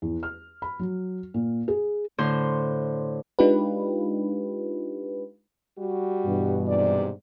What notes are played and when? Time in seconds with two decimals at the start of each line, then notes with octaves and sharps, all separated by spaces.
0.02 E2
0.23 F6
0.62 B5
0.79 F#3
1.34 A#2
1.68 G#4
2.18 A2 D3 C5 C6
3.39 G#3 D4 D#4 F4 G4 B4
5.78 G3 F#4
6.25 G2 B2 E3
6.67 G#2 C3 D5